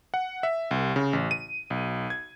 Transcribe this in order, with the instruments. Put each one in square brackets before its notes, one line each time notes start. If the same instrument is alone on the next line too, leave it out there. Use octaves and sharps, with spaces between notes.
[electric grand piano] F#5
E5
C2
C#3
A1
D#7
B1
G#6